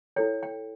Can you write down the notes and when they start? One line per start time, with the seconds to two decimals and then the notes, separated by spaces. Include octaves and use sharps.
0.16 E4 A4 C#5 G5
0.43 G5